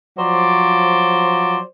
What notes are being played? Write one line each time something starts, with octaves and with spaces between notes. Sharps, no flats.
F3 F#3 C5 D5